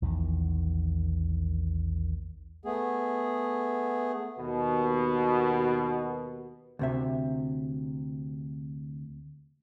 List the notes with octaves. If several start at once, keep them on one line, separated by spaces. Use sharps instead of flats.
A#1 E2 D#3
A3 B3 G#4
D#2 B2
D2 C3 E5